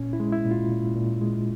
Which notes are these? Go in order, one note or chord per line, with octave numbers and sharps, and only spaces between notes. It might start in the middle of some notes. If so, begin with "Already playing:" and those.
Already playing: A#2 C#4
E4
G#3
E4
A#2
F4
A#2
A#2
G#3